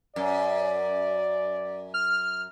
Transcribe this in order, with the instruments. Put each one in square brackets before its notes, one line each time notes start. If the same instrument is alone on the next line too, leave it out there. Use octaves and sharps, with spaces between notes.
[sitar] F#2 [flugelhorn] D5
[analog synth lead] F6